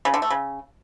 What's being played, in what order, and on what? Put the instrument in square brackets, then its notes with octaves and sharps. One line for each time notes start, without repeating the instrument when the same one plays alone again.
[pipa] C#3
D3
A3
C#3